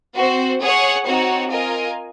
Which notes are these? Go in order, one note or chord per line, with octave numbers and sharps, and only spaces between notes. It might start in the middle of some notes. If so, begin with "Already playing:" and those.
C4 F#4 C5
G#4 C#5 F#5
C4 D#4 F#4 C#5 F#5
F4 A#4 D#5 G#5